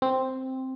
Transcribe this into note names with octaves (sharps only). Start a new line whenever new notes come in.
C4